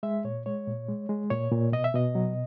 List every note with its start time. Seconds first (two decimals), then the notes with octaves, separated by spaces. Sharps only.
0.03 G#3 E5
0.24 A#2 C#5
0.46 G#3 C#5
0.67 A#2
0.89 G#3
1.09 G#3
1.30 A#2 C#5
1.51 A#2
1.72 B2 D#5
1.84 E5
1.94 B2 D#5
2.15 F#3